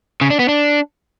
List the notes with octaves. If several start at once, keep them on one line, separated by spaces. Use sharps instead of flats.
C#3
D4
B3
D4